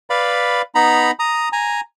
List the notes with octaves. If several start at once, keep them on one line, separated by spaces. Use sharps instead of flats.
B4 D5 F5 B5
B3 D#4 A#5 B5
A#5 D#6
G#5 A#5